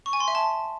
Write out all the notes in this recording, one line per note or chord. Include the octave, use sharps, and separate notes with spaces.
C#6
G#5
C6
E5
A5